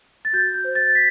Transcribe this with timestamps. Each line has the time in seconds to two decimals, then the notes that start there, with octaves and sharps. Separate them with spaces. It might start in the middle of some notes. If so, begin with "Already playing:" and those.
0.25 A6
0.33 F#4 G6
0.54 G6
0.64 C5
0.75 A6
0.95 B6